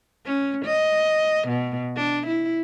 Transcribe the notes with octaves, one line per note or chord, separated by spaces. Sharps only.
C#4
D#5
B2
D4
E4